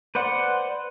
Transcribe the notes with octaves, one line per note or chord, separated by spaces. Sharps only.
B4 C5 D5 F#5